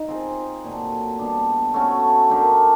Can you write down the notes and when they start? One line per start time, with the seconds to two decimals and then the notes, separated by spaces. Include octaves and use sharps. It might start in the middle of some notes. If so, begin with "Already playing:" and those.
Already playing: D#4
0.08 C4 F4 G#4
0.64 A#2 F#3 A3
1.19 G3 B3 D4
1.74 A3 C#4 F#4 A4
2.30 A3 D4 G4 A#4